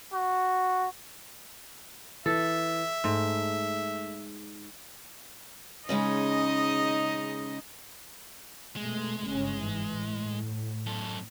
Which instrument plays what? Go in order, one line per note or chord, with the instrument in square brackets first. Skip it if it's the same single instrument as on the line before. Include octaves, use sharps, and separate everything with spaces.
[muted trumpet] F#4
[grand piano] E3 [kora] A4 [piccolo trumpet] E5
[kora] G#2 [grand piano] A3
[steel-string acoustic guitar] C#3 G#3 C#4 [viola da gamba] D#4 D#5
[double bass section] F2 B2 A3 [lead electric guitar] G#3
[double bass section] G1 C#3 C#4
G#2 E3
A2
[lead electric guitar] F#2 A4